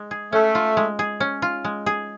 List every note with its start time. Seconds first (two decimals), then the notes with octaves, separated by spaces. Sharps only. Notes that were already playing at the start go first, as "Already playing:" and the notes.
Already playing: G#3
0.11 G#4
0.32 A3 C#4
0.55 F4
0.77 G#3
0.99 G#4
1.20 C#4
1.42 F4
1.65 G#3
1.86 G#4